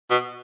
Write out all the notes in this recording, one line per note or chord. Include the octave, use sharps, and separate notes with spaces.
B2